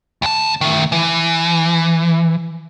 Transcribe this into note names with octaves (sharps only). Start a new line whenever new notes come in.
D2 A5
D#3 A3
E3